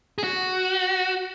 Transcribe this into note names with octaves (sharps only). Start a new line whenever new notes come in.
G#4
F#4